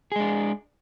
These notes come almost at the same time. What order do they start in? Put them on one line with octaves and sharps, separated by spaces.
G#4 G#3 D4